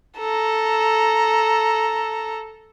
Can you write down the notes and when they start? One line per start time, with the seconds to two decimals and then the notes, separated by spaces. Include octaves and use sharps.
0.19 A4 A#5